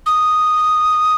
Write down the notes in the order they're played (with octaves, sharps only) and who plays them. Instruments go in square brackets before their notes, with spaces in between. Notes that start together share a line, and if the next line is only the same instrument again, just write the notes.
[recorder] D#6